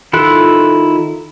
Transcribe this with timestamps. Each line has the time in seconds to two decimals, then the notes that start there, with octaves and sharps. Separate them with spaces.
0.13 D#3 E4 F4 A4 F#6